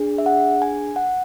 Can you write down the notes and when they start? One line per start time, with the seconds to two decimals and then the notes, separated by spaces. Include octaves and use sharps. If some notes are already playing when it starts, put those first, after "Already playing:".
Already playing: D4 G#4
0.18 E5
0.26 F#5
0.62 G#5
0.96 F#5